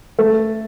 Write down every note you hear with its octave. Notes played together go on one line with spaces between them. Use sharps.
A3 A4